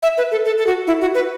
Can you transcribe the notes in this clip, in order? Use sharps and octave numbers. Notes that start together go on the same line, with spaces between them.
E5
B4
A4
A4
A4
F#4
E4
F#4
B4